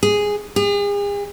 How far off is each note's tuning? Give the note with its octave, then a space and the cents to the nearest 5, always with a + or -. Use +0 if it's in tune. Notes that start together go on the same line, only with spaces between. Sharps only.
G#4 -5
G#4 -40